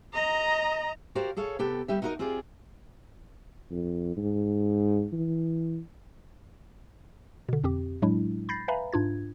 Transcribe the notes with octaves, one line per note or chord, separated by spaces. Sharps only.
D#5 A#5
F#4 G4 A#4 C5 D5 F5
G#4 A4 C#5 F5
C3 B3 G4 A4
D2 G3 G4 E5
D#4 E4 F#4 G#4 A#4 D#5
C4 F4 G4 G#4 D5
F2
G#2
E3
B2 D3
F2 C4 G4
A2 F#3 G#3 D4 E4
B5 G6 A6 A#6 C7
B4 E5 F5 G#5 A#5 B5
G#2 D4 F4 G#6